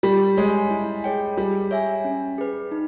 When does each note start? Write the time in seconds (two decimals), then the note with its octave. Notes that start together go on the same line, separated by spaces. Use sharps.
0.03 G3 G4
0.37 G#3 C#5 G#5
0.71 E4
1.04 G#4 C#5 G5
1.37 G3 G#4
1.71 C#5 E5 G#5
2.05 C#4
2.38 G#4 B4
2.72 D#4